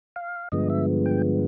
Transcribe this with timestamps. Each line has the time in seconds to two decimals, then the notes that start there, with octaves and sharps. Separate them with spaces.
0.16 F5
0.52 G2 D3 F3 G#3 B3 D#5
0.70 E5
1.06 G5